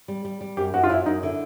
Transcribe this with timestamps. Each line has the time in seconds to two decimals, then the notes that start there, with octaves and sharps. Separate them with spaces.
0.08 G3
0.25 G3
0.41 G3
0.57 F#2 G4
0.74 F#2 F#4
0.84 F4
0.90 F#3 E4
1.06 F#2 D#4
1.23 D3 E4